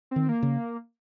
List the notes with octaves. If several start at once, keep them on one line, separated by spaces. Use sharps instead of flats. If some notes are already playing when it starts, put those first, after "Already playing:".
D#3 C4
A#3
C#3